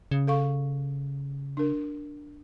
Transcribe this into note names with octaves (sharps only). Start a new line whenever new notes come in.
C#3
A4 F5 C#6
D4 A#4